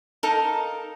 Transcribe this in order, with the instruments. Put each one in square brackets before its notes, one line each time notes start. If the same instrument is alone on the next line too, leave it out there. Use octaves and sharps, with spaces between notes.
[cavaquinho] D#4 A4 A#4 F5